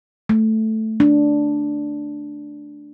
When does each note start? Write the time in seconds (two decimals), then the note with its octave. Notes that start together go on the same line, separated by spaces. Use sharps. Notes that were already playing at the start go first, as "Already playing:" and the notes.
0.29 A3
1.00 D4